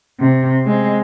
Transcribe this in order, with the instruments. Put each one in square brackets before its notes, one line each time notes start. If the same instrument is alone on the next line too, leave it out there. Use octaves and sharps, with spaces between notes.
[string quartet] C3
G#3 C4